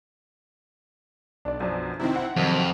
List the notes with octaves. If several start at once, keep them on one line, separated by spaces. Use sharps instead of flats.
B1 D4 D5
F#2 F3 D4
C3 D#3 C4 E4
F#5
F2 C3 D#3 F#3